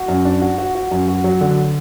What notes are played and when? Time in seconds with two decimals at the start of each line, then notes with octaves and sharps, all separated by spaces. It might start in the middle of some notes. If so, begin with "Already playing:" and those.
Already playing: F#4
0.08 F#2
0.25 D4
0.41 F#4
0.58 F#4
0.75 F#4
0.91 F#2
1.08 F#4
1.24 F#3
1.41 D3